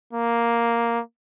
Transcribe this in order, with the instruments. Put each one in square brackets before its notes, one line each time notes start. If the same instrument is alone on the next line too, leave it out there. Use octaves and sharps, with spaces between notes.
[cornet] A#3